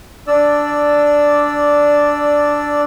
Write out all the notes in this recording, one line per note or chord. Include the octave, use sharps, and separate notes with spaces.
D4 D5 E6